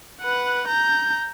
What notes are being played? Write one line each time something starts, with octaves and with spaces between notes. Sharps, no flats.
B4 F#5
A#5 G6